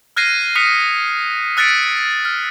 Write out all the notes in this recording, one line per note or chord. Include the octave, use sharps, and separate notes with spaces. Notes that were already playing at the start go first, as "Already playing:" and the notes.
F6 F#6 G#6 A#6 C7 D#7
D#6 F#6 B6 C#7 D#7
E6 F#6 A6 B6 C#7 D7
F6